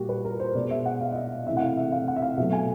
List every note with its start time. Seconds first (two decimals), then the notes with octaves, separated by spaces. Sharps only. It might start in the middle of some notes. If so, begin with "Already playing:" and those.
Already playing: A#2 G3 A#3 F#4 G4
0.09 B4
0.24 A#4
0.40 C5
0.55 B2 G#3 D5
0.71 E5
0.86 F#5
1.01 F5
1.12 D#5
1.15 E5
1.46 C3 E3 A3 E5
1.57 F#5
1.62 F5
1.77 E5
1.92 F5
2.08 F#5
2.16 E5
2.22 F5
2.38 B2 F#3 A3 E5
2.53 G#5